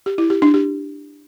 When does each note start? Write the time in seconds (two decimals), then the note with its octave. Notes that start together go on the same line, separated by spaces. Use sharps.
0.06 G4
0.18 E4
0.30 G4
0.42 D4
0.54 G4